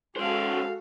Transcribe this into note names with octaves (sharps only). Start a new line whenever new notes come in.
G#3 C#4 F#4 A4 C5 F5